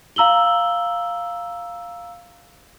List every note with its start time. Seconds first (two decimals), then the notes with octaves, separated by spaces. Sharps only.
0.16 F5 A#5 E6 F#7 G7